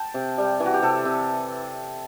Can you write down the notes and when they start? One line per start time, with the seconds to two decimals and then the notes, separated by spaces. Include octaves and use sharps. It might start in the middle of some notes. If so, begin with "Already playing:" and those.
Already playing: G5 A5
0.14 C3
0.38 G3
0.60 E3
0.66 F#4
0.74 G4
0.82 C3 A4
1.05 C3